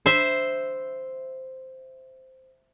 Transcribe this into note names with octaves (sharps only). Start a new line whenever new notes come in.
C5 E5